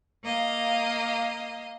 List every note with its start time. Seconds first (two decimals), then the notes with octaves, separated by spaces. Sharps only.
0.22 A#3 D#5 F5